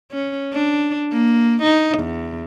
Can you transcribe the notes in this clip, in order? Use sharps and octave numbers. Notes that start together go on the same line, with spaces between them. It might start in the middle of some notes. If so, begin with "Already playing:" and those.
C#4
D4
A#3
D#4
E2